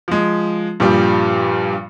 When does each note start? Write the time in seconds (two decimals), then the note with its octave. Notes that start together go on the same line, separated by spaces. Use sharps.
0.08 F3 G#3
0.80 G2 A#2 F3 G3